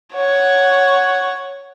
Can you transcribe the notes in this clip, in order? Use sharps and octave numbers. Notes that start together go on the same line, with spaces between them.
C#5 F#5